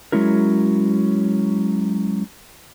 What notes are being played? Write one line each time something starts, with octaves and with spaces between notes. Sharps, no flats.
F#3 G#3 C#4 E4 A#4